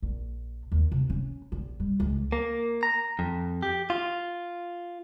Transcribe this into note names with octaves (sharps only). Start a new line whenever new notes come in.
A#1
D#2
C3
C#4
A#1
G3
C#2
A#3
A#5
F2
G4
F4